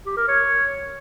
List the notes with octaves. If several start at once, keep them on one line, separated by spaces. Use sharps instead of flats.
G4
A#4
C#5